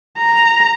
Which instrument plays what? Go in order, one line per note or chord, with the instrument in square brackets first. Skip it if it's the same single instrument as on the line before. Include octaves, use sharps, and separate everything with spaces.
[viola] A#5